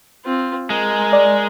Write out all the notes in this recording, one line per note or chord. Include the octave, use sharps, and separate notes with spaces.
C4 F4
G#3 A#4
D5